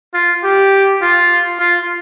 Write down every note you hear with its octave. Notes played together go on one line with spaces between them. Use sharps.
F4
G4
F4
F4